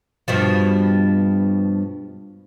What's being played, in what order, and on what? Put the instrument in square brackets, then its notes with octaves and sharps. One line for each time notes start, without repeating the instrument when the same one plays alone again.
[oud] G2 B2 F3